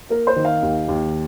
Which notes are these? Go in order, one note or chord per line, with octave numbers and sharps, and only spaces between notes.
A#3 A#4
C5
D#3
F5
D#2
D#2